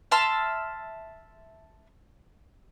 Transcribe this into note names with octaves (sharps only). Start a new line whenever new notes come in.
E5 A5 C6 F6